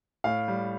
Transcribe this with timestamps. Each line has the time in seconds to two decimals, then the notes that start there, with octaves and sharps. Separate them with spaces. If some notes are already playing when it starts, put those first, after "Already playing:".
0.24 A2 F5
0.48 G3